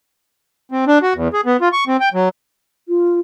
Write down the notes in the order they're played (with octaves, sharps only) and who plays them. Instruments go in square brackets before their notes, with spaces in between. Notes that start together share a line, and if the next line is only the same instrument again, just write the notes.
[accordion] C4
D4
F#4
E2
G#4
B3
F4
C#6
C4
G5
F#3
[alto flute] F4